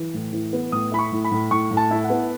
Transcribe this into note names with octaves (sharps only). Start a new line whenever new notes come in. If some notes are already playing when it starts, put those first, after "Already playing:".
Already playing: E3
A2
E3
B3
A2 D#6
E4 B5
C#6
A2
B5
A2
A2 C#6
A2
A5
E4
F#5
B3